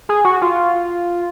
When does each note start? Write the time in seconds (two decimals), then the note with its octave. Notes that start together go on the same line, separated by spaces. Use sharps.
0.09 G#4
0.24 F#4
0.41 F4